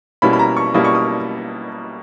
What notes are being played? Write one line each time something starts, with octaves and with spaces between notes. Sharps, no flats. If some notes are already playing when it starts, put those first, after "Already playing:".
B2 G3 A#3 C#4 E4 B5
B5
A#5
C#6
B2 G3 A#3 C#4 E4 D#6
C#6
D#6